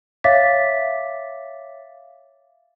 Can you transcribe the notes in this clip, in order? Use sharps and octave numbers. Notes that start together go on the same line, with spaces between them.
C#5 E5 F5 D6 A6 B6